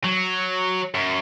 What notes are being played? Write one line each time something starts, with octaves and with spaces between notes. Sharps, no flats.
F#3
F#2